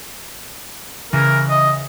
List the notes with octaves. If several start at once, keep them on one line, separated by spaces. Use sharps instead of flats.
C#3 E3 A#4
D#5